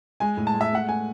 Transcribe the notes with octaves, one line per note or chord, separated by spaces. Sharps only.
G#3 G#5
A2
A5
G#3
E5
A3 F#5
A3 G#5